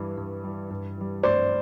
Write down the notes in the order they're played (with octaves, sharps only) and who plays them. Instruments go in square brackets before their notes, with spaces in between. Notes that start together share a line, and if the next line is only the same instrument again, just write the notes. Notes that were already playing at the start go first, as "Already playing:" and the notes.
Already playing: [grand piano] G2 E3 G3
G2
E3 G3
G2
E3 G3
[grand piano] G2 [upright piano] C5 D5